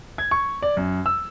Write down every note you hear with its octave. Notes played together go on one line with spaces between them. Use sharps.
G#6
C#6
D5
F#2
E6